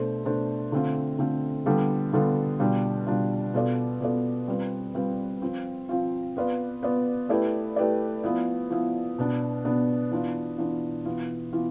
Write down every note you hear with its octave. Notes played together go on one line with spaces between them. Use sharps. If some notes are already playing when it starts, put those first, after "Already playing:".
Already playing: B2 A3 D4 A4 C5
B2 A3 D4 A4 C5
D3 A3 C4 F4
D3 A3 C4 F4
D3 G3 B3 F4 A4
D3 G3 B3 F4 A4
B2 G3 D4 F4
B2 G3 D4 F4
B2 B3 F4 A4 D5
B2 B3 F4 A4 D5
G3 C4 F4 B4
G3 C4 F4 B4
F3 C4 F4
F3 C4 F4
B3 F4 B4 D5
B3 F4 B4 D5
A3 E4 G4 B4 D5
A3 E4 G4 B4 D5
F3 B3 E4
F3 B3 E4
B2 B3 D4
B2 B3 D4
E3 B3 D4 F4
E3 B3 D4 F4
E3 B3 F4
E3 B3 F4